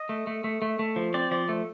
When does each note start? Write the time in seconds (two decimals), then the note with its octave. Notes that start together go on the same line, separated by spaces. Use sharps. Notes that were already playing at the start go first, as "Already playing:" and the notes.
Already playing: D#5
0.09 A3
0.27 A3
0.44 A3
0.62 A3
0.79 A3
0.96 F3
1.14 C4 D5
1.31 F3 D5
1.49 A3